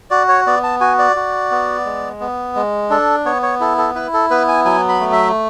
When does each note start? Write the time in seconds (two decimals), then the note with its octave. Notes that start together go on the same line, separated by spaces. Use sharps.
0.10 F#4 D5
0.28 C#5
0.46 B3 D5
0.63 A5
0.81 F#4 G#5
0.99 D5
1.16 F#4
1.51 B3
1.85 G#3
2.20 B3
2.56 G#3
2.90 D4 A4
3.25 B3 C#5
3.43 C#5
3.60 E4 A4
3.78 A4
3.95 E4 B4
4.14 A4
4.30 B3 B4
4.48 G#5
4.65 F#3 G#5
4.89 B5
5.00 A3
5.12 E5